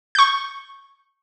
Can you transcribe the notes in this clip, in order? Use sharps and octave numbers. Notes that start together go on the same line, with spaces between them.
C#6 G6